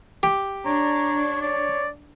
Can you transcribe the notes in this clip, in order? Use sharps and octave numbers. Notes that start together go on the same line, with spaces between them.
G4
D4 C#5 A#5
C#5 D5